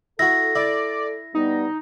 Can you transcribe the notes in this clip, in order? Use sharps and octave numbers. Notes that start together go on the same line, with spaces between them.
E4 F#4 A4 A#6
E4 D5
G3 B3 D#4